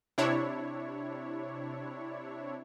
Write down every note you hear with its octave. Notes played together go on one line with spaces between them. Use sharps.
C3 D4 E4 C#5